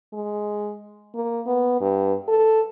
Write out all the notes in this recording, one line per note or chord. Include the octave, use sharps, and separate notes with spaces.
G#3
A#3
B3
G2
A4